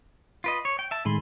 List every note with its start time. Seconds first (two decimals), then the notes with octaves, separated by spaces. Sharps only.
0.44 F4 B4 D#5
0.65 C#5
0.79 G5
0.91 E5 A5
1.05 A2 D#3 G#3 G#5 B5 C6